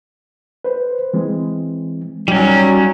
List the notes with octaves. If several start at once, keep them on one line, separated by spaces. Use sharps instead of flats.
B4 C5
E3 G#3 C4
F#3 G3 C#4 D#4